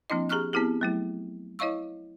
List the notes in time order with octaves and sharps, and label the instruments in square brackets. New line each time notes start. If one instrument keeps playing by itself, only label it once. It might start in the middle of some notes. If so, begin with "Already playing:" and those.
[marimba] F3 A#3 C4 D4 E4 D#5
G4 G#4 A#5 C#6 F6 F#6
B3 C4 E4 G4 G#4
F#3 A3 E4
E4 C#5 D#5 F5 C#6 E6